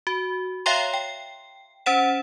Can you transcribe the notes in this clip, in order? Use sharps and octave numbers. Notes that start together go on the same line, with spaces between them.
F#4
C#5 E5 F5 G5 A#5 C6
G5
C#4 C5 F#5 E7